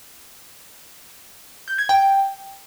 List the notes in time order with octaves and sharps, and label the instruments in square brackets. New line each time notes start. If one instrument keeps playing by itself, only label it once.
[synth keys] G6
G#6
G5